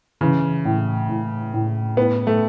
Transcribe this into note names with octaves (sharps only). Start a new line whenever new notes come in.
C#3 E3
A2
A2
A2
A2 B3
A3